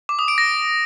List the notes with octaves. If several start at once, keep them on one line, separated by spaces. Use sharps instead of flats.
D6
D#6
D7
A#6